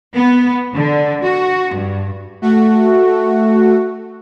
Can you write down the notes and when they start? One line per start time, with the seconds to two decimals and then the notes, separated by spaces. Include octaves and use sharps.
0.14 B3
0.74 D3
1.23 F#4
1.73 G2
2.42 A3 F#4